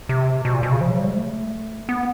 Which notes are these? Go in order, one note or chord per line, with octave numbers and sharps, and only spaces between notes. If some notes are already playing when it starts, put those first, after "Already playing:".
C3
B2
A#2
B2
C#3
F3
F#3
G3
G#3
A3
B3